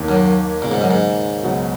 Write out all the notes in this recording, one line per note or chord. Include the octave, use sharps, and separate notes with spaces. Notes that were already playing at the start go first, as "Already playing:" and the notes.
Already playing: D#2 D#3 A#3
F#2
D#2 A#2 C#3 G#3
G#2
F#2
G#2
C#2 B2 F#3 B3 F#4